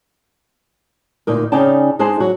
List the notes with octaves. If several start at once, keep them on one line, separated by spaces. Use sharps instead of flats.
D2 A#2 D#4 A#4
C#3 C#4 D#4 D5 G5 A5
G#3 D4 D#4 G#4 C5
F#3 F#4